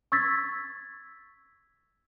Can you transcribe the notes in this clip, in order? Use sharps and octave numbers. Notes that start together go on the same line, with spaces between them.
C#6 E6 G#6 A6 B6